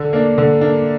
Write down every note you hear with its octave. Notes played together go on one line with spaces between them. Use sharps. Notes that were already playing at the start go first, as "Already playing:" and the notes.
Already playing: D3
A#3 D4
D3
A#3 D4